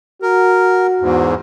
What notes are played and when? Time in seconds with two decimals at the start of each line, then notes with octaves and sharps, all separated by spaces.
0.22 F#4 A#4
1.01 E2 G#2